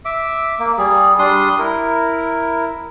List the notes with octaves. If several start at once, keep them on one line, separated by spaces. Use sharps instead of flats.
E5 D6
A#3
G3 G#4
G3 D4 C6 D#6
E4 A#4